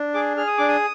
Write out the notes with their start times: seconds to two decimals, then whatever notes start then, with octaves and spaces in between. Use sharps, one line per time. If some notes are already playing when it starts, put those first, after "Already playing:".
Already playing: D4
0.14 G#4 D6
0.37 G#4 F6
0.47 D#6
0.58 D4 D6
0.69 D#6